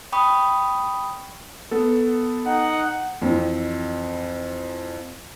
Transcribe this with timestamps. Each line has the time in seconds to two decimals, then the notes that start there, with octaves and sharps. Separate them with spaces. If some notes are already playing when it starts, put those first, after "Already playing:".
0.12 G5 B5 C#6 D#6
1.71 B3 A4
2.47 D#4 F#5
3.21 F2 E3